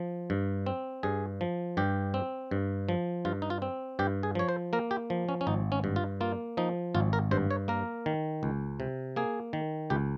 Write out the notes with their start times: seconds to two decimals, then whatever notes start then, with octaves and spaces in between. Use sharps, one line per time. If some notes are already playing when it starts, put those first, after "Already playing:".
Already playing: F3
0.30 G2
0.66 C4
1.03 G2 G#4
1.41 F3
1.77 G2 G4
2.14 C4
2.51 G2
2.89 F3
3.25 G2 F4
3.42 D#4
3.50 F4
3.62 C4
3.99 G2 G4
4.23 G#4
4.35 F3 C#5
4.49 C5
4.73 A#3 A#4
4.91 G4
5.10 F3
5.29 C#4
5.41 C#4
5.47 G#1 D#4
5.72 C#4
5.84 G2
5.96 F4
6.21 A#3 F4
6.57 F3 D#4
6.95 G#1 F4
7.13 A#4
7.31 G2 C5
7.51 C#5
7.68 A#3 A#4
8.06 D#3
8.43 C#2
8.80 C3
9.16 A#3 G#4
9.53 D#3
9.90 C#2 G4